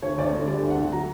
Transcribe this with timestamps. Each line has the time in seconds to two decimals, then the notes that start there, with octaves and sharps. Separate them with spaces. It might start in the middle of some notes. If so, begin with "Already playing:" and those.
0.02 D2 C#5
0.18 D2 D5
0.25 C#5
0.33 D3
0.47 G3 D5
0.63 D2
0.70 F#5
0.78 D2
0.92 F#3 A#5